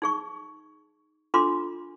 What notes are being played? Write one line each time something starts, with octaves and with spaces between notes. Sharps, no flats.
D#4 G#4 C#6
D4 F4 A4 C6 D6